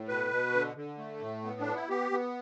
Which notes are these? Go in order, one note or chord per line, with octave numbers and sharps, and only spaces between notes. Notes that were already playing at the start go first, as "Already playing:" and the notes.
Already playing: A2
B2 B4
B2
D3
D3
A3
A2
B3
D4
B3
E4
B3 G4
B3